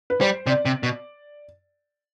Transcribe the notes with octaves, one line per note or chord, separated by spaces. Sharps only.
B4
G3 C5
C3 D5
C3
B2